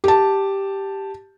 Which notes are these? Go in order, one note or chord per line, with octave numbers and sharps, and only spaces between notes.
G4 A5